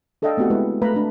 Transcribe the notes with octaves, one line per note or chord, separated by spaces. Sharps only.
D4 A4 D5 D#5 F5 G5
A3 B3 C4 F#4 G4 F#5
G#3 E4 B4
A3 B4 F5 A#5 B5
A3 D4